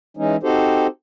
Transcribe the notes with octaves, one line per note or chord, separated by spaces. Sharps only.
E3 G#3 C#4 D#4
C4 D#4 F#4 G4 A4 C5